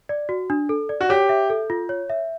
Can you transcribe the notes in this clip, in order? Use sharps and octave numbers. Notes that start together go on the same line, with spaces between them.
D5
F#4
D4
A4
D5
F#4
G4 C#5
E5
A4
F4
C#5
E5